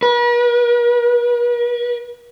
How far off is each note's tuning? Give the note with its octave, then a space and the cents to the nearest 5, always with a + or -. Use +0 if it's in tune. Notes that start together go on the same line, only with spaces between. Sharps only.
B4 -45